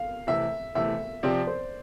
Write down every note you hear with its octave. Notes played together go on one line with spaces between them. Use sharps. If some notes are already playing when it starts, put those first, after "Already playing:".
Already playing: F5
C3 E3 A3 E5
C3 E3 A3 E5
C3 F3 C4 G4 D5
C5